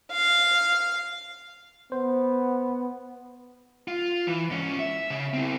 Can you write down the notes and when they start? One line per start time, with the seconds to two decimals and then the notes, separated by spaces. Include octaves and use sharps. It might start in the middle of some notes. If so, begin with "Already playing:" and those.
0.12 F5
1.92 B3 C5
3.88 F4
4.27 E3
4.50 G#2 C#4
4.79 E5
5.10 C#3
5.34 C4 E4